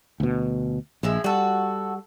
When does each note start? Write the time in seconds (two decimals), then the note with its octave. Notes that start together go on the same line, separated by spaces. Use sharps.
0.20 D2 B2
1.03 A#1 F3 G#3 E4
1.24 G3 F#4 A4